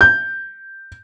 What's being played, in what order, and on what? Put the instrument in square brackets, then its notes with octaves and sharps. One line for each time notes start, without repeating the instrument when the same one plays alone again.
[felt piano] G6